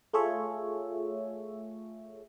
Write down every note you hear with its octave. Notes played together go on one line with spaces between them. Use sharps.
A3 F4 G#4 A4 C#5 E5